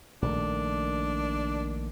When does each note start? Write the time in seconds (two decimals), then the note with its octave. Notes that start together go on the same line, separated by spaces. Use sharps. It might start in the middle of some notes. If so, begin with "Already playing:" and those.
0.22 A#1 D#3 A3 D4